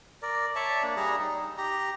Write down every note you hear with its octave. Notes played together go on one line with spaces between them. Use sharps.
A#4 D5
C#5 D5 E5 A5
A#3 D4
G3 G#4 A#5
D#4
G4 A#5